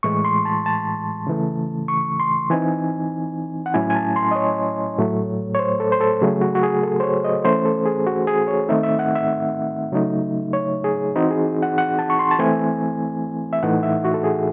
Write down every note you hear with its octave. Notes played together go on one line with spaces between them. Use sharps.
A2 E3 G#3 C#6
C6
A5
A5
C#3 E3 A3
C#6
C6
E3 C4 D#4 G#5
F#5
A2 F#3 A3 C#4 E4 G#5
G#5
A5
C6
D#5
C#5
A2 F#3 A3
C#5
C5
A4
C5
A4
C#3 F#3 A3 G#4
F#4
F#4
G#4
A4
C5
C#5
D#5
E3 A3 C#4 C5
A4
G#4
F#4
G#4
C#5
D#3 A3 C4 D#4 E5
E5
F#5
E5
C#3 F#3 A3 D#4
C#5
G#4
E3 C4 D#4 F#4
G#4
F#5
F#5
A5
C#6
C6
A5
E3 A3 C4 E4 G#5
E5
A2 E3 A3 D#4 F#5
E5
F#4
A4
G#4